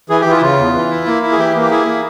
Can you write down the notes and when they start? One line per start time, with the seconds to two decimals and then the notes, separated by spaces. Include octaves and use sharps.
0.10 E3 G#4
0.21 G4
0.26 E3
0.32 F4
0.37 E4
0.42 C#3 F4
0.59 E2
0.74 E3
0.91 E4
1.06 A#3
1.23 E4
1.32 G#4
1.39 E3 G4
1.55 A#3
1.62 G4
1.70 E4 G#4
1.86 A#3